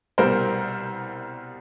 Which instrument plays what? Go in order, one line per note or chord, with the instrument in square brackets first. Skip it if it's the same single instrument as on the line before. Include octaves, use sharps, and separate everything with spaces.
[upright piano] C2 B2 G3 A#4 C5